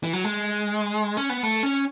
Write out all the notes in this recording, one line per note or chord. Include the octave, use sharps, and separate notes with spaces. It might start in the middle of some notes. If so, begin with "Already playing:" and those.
E3
F#3
G#3
C#4
B3
A3
C#4